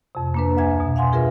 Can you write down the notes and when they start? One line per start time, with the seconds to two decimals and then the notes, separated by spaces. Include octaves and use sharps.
0.15 F2 C3
0.34 A#3 D4 B4
0.57 D2 E5 G#5 G#6
0.80 B2
0.96 F5 F#5 G#5 C6
1.12 F4 G#4 A#4 B4 E5